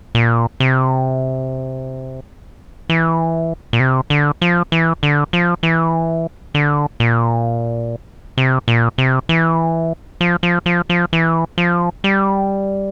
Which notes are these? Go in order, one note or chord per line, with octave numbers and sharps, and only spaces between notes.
A#2
C3
E3
A#2
C3
D3
F3
E3
D3
F3
E3
D3
A#2
C3
A#2
C3
E3
F3
F3
F3
F3
E3
F3
G3